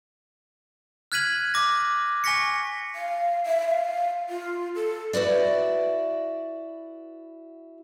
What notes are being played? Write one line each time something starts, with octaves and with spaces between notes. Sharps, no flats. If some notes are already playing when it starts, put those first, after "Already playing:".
F6 F#6 G#6 B6 D#7 F#7
D6 A#6
G#5 C#6 A#6 B6 C#7
F5
E5
F5
F4
A4
E4 F#4 B4 D5